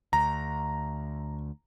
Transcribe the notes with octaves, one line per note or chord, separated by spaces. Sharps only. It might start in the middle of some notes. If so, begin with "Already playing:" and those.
D2 A#5